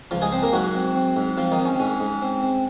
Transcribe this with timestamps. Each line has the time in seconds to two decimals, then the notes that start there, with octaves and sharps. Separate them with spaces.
0.11 C#2 F3 F4
0.22 G#3 G#4
0.32 C4 C5
0.43 A#3 A#4
0.53 G#2 F#3 F#4
0.75 C4
0.95 C4
1.17 G#2
1.37 F3 C4 F4
1.52 D#3 D#4
1.59 C4
1.65 C#4
1.80 G#2 C#4
2.00 G#2
2.22 C4
2.42 C4